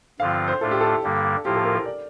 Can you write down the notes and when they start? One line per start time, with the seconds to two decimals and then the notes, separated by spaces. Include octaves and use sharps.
0.20 G2 D3 F3 C4 F4 F5
0.48 C5
0.61 A2 A3 D4 F4 A4
0.71 G4
0.81 A4
1.03 G2 D3 G3 A#3
1.45 A2 F3 A#3 F4 G4
1.56 A4
1.65 A#4
1.76 A#4
1.86 D5